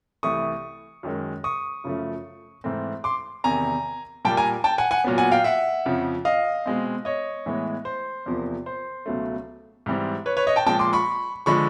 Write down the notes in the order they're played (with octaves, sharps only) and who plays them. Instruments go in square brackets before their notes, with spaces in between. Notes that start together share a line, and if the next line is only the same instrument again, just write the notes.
[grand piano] C2 C3 E3 A3 C#6 D#6
F#2 D#3 G#3
C#6 D#6
F#2 C#3 F3 A3
G#2 E3 A3 C4
C6 D6
E2 C3 D#3 G#5 A#5
A#2 G3 A#3 G5 A5
G#5 A#5
G5 A5
F#5 G#5
F#5 G#5
A#2 F#3 B3
F#5 G#5
F5 G5
E5 F#5
F2 C#3 F3
D#5 F5
B2 G#3 C4
C#5 D#5
A2 E3 G#3 B3
C5
E2 C3 F3 A#3
C5
C#2 B2 F#3 A3
G#2 E3 G3 C4
B4 C#5
B4 C#5
C#5 D#5
G5 A5
A#2 F3 G#3 G5 A5
C6 D6
B5 C#6
D3 F3 G#3 B5 C#6